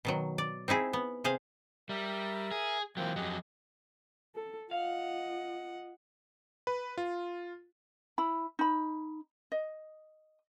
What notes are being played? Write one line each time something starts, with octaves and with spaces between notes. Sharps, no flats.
B2 D#3 F#3
D5
C4 D#4 E4 G#4
B3
C3 G#4 C5 F5
G3 A#4 E5
G#4
E3 F#3 A#3 C4 G5
F2 F#3 G4 G#4 D#5
A4
F4 D#5 F5 F#5
B4
F4
E4 B5
D#4 B5
D#5